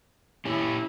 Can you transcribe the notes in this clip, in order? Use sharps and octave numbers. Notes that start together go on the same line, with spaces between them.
C#4 E4 G4 C#5